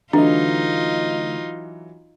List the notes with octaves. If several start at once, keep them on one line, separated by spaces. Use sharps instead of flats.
D3 E3 F#3 A3 D4 D#4 F4 D#5